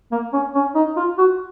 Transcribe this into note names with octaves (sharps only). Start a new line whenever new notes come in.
A#3
C#4
C#4
D#4
F4
F#4